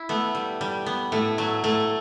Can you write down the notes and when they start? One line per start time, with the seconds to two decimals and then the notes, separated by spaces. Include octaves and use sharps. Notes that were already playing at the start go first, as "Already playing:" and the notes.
Already playing: E4
0.09 A3 B3
0.35 G3
0.61 G3
0.86 B3
1.12 A2 A3
1.38 F#3 A3
1.64 A2 A3